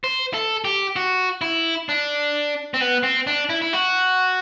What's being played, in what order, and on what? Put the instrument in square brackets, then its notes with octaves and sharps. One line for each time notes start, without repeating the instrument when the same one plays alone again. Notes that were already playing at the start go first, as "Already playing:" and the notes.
[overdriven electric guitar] C5
A4
G4
F#4
E4
D4
C4
B3
C4
D4
E4
E4
F#4